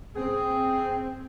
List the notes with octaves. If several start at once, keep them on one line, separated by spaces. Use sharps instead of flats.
C4 G#4